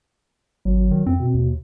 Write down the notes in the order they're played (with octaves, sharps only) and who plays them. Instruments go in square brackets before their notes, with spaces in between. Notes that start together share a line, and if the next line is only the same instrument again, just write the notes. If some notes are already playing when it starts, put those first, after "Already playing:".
[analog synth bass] G#1 [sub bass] F#3
[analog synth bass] D#3
[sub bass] F2 [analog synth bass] C4
[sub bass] B2
[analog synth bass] D#2